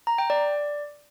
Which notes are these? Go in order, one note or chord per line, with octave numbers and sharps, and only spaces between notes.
A#5
G5
D5